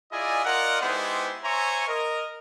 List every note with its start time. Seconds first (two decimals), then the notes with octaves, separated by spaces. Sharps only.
0.12 E4 F4 G#4 D5 D#5 G#5
0.45 F4 A#4 D5 D#5 F#5
0.82 G#3 B3 D#4 E4 G4 C5
1.44 C5 C#5 E5 G#5 A#5 C#6
1.88 A#4 D#5